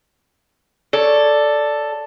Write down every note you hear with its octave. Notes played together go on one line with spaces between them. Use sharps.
A4 C#5 D5